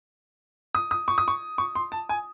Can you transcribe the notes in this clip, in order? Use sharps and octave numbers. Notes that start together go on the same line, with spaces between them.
D#6
D#6
C#6
D#6
C#6
C#6
C6
A5
G#5